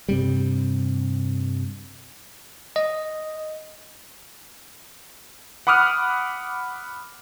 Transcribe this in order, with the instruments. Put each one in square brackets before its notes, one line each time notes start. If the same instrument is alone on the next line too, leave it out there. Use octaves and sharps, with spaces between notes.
[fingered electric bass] G2 C3 G3
[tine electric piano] D#5
[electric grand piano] F#5 B5 D6 D#6 F6 F#6